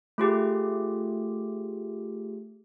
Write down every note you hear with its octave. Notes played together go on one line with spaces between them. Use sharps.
A3 F4 G4 G#4